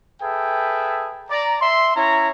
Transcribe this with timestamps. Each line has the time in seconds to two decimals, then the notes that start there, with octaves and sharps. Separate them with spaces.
0.22 G#4 A4 B4 E5 G5
1.31 D5 A#5
1.61 E5 C6
1.96 C#4 E4 C#5 A#5